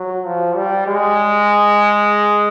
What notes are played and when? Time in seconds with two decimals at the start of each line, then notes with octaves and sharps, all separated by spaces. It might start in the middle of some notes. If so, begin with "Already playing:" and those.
Already playing: F#3
0.25 F3
0.56 G3
0.87 G#3